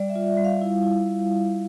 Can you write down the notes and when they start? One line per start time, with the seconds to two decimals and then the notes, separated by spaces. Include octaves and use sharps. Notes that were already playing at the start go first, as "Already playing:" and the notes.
Already playing: G3 D5
0.09 E5
0.16 F4
0.26 E5
0.38 G3
0.45 F5
0.61 E4
0.84 E4